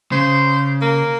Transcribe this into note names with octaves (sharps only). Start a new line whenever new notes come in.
C#3 C5
A#3